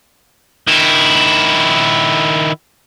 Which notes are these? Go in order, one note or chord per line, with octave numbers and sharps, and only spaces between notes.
D#3 E4